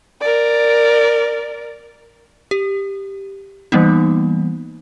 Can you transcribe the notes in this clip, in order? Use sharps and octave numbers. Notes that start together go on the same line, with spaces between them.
A#4 D5
G4
E3 G3 A#3 B3 D#4